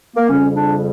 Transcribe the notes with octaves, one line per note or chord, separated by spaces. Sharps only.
A#3
F2 C#3 G3 C#4
D4